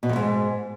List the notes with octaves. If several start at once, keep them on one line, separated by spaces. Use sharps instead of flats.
B2
F2
G#2